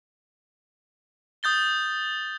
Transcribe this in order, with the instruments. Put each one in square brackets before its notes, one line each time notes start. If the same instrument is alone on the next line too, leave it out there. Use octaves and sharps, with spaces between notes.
[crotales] D#6 G6 A6 G7